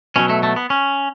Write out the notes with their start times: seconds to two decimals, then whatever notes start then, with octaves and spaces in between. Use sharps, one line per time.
0.16 B2 F#3 C#4
0.30 A3
0.43 A3
0.56 B3
0.70 C#4